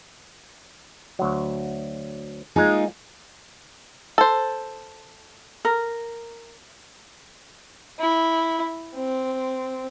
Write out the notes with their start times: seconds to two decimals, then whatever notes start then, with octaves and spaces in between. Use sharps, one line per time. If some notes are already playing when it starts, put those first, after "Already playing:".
1.19 D2 F#3
2.56 G#3 A#3 D#4 F4 G#4
4.18 A4 C5
5.65 A#4
7.99 E4
8.95 C4